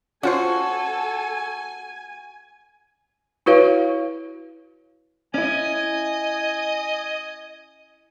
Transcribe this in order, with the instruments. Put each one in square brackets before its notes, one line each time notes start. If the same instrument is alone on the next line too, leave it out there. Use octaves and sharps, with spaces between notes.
[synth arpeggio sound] C#4 F4 C5 [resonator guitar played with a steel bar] F#4 [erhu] A4 [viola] G#5
[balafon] E4 F#4 B4 C#5 F5
[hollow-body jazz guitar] C#4 E4 [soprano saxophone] D#5 [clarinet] G#5